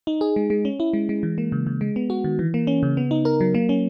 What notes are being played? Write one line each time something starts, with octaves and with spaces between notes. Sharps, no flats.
D#4
G#4
G#3
G#3
C#4
E4
G#3
G#3
E3
A#3
C#3
C#3
G#3
B3
F#4
D#3
E3
A#3
C#4
C#3
B3
D#4
A#4
F#3
A#3
C#4